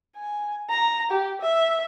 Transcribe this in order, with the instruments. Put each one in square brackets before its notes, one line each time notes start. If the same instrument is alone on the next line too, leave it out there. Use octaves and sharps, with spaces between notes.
[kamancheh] G#5
A#5
G4
E5